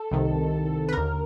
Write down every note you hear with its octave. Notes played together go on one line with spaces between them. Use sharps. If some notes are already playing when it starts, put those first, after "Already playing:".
Already playing: A4
C2 C3 D#3
B4
D#2 D3 A#4